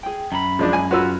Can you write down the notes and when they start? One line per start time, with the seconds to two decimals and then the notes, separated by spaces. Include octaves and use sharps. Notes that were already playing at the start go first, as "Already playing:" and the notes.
0.03 G#4 G5
0.32 F#2 A#5 B5
0.59 F3 G#3 D4
0.73 G#5
0.91 F4 F#4 G#4 A#4 B4 E6